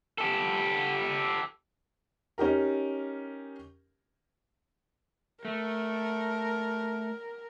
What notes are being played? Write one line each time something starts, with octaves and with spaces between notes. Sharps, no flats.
G4 A4
C#4 D#4 G4 A#4
A3 A#4